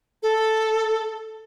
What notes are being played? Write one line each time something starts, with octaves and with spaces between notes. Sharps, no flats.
A4